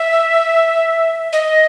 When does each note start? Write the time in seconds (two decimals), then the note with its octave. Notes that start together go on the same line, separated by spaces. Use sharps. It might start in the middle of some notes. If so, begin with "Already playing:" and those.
Already playing: E5
1.33 D#5